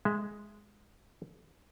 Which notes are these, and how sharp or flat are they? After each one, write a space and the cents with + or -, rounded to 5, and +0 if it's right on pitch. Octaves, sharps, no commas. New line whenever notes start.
G#3 +0 E5 +0